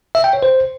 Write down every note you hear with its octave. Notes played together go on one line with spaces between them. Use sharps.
E5
G5
C#5
C5